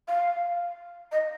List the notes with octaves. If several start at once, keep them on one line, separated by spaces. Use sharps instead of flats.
F5
D#5